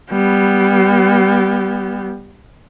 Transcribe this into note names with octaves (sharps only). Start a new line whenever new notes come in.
G3 B3